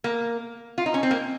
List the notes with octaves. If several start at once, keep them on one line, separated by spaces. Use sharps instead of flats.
A#3
F4
D#4
C#4
C4
A#3